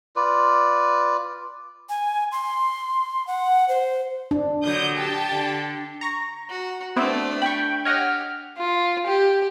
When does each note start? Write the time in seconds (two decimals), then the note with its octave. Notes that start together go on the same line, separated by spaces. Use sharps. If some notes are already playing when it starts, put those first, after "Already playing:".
0.16 F4 B4 D5
1.89 G#5
2.32 C6
3.27 F#5
3.69 C5
4.31 D4
4.63 A#2 D3 F#3 D#6 G6
4.95 G4 G5 A5
5.32 D3
6.01 A#5 C#6 A#6
6.50 F#4
6.96 A3 B3 C4 D4 E4
7.42 G5 B5 C#6
7.85 G4 C#5 D#5 F#5 F6
8.58 F4
9.07 G4